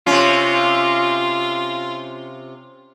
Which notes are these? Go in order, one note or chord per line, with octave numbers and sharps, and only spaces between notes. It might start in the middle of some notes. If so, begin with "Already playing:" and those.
C3 C#4 F4